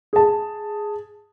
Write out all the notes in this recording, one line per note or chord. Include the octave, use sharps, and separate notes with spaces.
G#4 A5